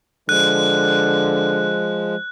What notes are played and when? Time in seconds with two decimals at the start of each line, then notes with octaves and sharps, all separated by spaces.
0.29 D3 F3 G#3 F#6